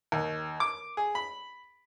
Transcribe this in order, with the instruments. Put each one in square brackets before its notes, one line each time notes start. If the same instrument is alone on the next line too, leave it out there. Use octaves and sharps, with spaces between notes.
[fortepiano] D#2
D6
G#4
B5